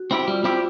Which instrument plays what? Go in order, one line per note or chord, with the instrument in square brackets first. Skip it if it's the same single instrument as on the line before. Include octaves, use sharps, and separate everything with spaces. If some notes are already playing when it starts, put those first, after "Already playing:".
Already playing: [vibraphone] F#4
[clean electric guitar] C4 E4 G4
[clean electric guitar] G3 [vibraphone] F4
[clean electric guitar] C4 E4 G4